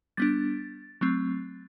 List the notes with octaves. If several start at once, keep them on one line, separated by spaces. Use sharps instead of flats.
G3 B3 D4 A6
F#3 A3 C4